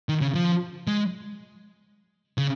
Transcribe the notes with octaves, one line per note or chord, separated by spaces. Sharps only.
D#3
C#3
F3
G#3
C#3